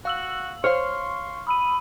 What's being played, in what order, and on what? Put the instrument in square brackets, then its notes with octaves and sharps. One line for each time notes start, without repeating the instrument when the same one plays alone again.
[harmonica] F#4 [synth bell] F5 E6 F#7
[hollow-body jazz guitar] C5 C#5 [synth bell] F5 F6 [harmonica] C6 C#6
[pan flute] B5 [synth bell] D#6 E6 D#7